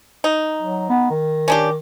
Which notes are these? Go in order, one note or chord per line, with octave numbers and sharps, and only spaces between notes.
D#4
F#3
B3
D#3
C#4 D4 G4